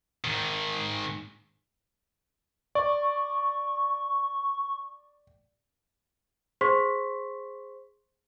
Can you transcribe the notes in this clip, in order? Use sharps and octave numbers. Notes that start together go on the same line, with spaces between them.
G#2 D#3
D5 C#6
G#4 C5 C6 C#6 B6